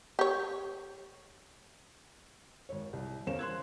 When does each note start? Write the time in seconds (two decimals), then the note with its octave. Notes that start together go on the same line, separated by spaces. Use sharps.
0.19 G4 C#5
2.69 G#1 C#5
2.93 C2
3.27 E2 C#4 A#4 C5 F5 E7
3.39 C6 F#6 G#6